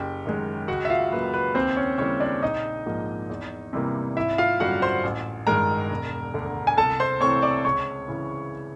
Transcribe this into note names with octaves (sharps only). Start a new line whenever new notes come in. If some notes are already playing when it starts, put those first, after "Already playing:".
Already playing: F#1 G4
F#2 D#3 G#3
C#2 F#4 F#5
E5
F4 F5
C#3 F#3 A#3 B4
B4
D#2 C4 C5
C#4 C#5
C#3 E3 G3 A#3 C#4 C#5
D4 D5
A#1 D#4 D#5
G#2 F3 A#3
E2
C3 E3 G3 A#3
G#1 E4 E5
F4 F5
F#2 D3 G3 F#4 F#5
C5 C6
A1
G2 D#3 G#3 A#4 A#5
E1
D2 D3
G#5
C2 A4 A5
C5 C6
C3 E3 A3 C4 C#5 C#6
D5 D6
C#2 C#5 C#6
C#3 E3